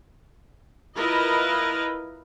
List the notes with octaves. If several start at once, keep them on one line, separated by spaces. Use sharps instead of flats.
E4 F4 A#4 B4 D#5